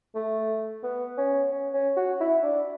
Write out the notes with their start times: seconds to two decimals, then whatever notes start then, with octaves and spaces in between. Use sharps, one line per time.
0.15 A3
0.83 B3
1.18 C#4
1.52 C#4
1.74 C#4
1.97 F#4
2.20 E4
2.43 D4